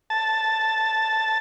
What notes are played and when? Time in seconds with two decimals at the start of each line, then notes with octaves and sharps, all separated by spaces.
0.10 A5